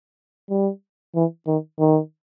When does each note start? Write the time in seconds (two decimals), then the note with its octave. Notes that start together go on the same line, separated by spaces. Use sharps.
0.50 G3
1.15 E3
1.47 D#3
1.79 D#3